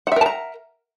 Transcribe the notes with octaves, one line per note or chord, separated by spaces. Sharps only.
A#4 E5 F#5 A5 A#5